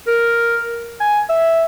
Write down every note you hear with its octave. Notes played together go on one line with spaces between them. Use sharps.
A#4
G#5
E5